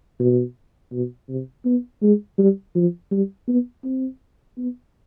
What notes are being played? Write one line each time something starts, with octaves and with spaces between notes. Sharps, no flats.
B2
B2
C3
B3
G#3
G3
F3
G3
B3
C4
B3